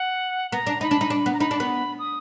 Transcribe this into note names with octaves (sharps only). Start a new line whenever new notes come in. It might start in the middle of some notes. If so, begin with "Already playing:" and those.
Already playing: F#5
B3 A#5
D4
D#4 B5
D4
D#4
D4
B3
A#5
D#4 B5
D4
B3
D#6